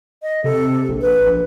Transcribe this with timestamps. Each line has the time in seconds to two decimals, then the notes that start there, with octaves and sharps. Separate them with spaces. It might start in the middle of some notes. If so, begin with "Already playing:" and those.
0.23 D#5
0.44 C3 A4
0.88 A#1
1.01 B4
1.26 A#1